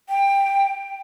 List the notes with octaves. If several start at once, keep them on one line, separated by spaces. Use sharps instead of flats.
G5